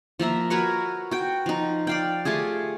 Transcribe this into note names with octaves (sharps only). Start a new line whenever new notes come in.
F3 A#3 E5 A#5
F#4 A#4 B4 C#5
F#4 G5
F3 D#4
D5 F5 G5
A3 F4 G4 G#4